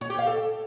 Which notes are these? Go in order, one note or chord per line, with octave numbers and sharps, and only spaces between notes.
C#5
G4
F5
A4